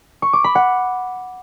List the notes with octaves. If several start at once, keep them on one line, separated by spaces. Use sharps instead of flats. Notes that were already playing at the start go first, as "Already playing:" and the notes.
C#6
D6
B5
F#5